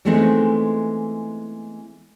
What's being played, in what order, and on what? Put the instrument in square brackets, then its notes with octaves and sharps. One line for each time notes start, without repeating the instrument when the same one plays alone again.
[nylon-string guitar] E3 G#3 A3 B3 C4 D#4